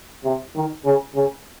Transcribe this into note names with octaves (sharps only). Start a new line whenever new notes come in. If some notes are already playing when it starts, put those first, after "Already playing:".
C3
D#3
C#3
C#3